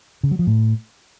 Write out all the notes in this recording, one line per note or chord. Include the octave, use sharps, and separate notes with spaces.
C#3
F#3
F3
A2